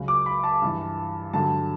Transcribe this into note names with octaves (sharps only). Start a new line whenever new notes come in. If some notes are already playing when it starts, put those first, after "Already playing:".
Already playing: C#2 C#3 F#3
D6
B5
A5
G2 E3
G2 D3 F#3 A5